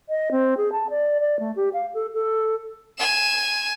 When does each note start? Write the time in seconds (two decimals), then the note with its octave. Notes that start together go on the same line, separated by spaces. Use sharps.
0.09 D#5
0.31 C4
0.57 G#4
0.72 A5
0.90 D5
1.20 D5
1.40 A3
1.56 G4
1.74 F5
1.94 A4
2.14 A4
2.98 G#5 E7